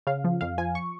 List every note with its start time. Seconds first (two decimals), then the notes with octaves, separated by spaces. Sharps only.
0.07 C#3 F5
0.24 F3
0.41 F2 F5
0.58 F3 G#5
0.75 C#6